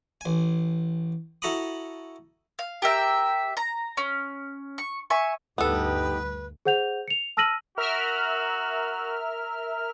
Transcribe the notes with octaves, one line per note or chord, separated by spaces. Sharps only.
A1 G#5
E4 F#4 A4 A#5 B5 D#6
F5
G4 A#4 E5 G5
A#5
C#4
C#6
E5 G#5 C#6
D2 G2 B3 D#4 G4 A4 B4 D6
G#4 C5 F#5 G6 F7
C#7 F7
A5 E6 F6 A#6 D#7 F#7
F#4 A#4 E5 F6